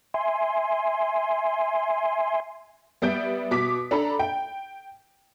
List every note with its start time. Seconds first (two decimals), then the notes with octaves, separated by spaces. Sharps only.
0.14 E5 G#5 C6
3.02 G3 B3 E5 G6 D7
3.51 B2 D6 B6
3.91 D4 A4 A#5 B5
4.19 G5